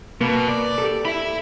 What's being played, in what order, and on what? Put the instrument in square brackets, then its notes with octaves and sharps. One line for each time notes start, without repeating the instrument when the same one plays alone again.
[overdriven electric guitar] B2 [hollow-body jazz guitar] A#3 B4
[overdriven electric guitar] D5
[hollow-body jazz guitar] G4 A4
[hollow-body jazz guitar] E4 [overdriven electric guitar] E5 B5